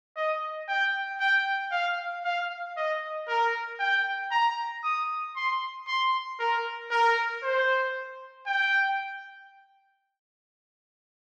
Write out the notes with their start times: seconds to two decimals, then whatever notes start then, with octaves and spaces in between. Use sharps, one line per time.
0.17 D#5
0.69 G5
1.20 G5
1.72 F5
2.25 F5
2.77 D#5
3.28 A#4
3.80 G5
4.31 A#5
4.84 D#6
5.36 C6
5.87 C6
6.40 A#4
6.91 A#4
7.43 C5
8.47 G5